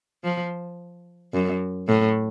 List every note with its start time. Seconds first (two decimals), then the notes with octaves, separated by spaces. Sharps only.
0.24 F3
1.33 F#2
1.88 A2